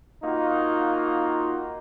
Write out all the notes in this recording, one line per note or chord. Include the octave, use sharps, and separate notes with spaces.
A#3 D#4 F4 F#4